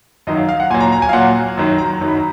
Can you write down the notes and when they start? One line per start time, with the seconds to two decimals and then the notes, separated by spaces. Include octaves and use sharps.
0.27 F#2 D#3 F#3 D#5
0.37 F5
0.49 F5
0.60 F#5
0.70 A#2 G#5
0.74 F#3
0.81 A#5
0.92 A#5
1.02 G#5
1.09 F5
1.13 A#2 F#3 F#5
1.57 F#2 D#3 F#3
1.78 A#5
2.01 F#2 D#3 F#3
2.08 B5
2.17 A#5